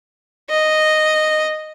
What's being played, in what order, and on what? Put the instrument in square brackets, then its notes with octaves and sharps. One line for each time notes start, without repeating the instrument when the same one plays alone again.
[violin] D#5